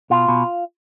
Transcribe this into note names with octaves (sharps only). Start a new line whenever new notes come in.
B2 F4
B2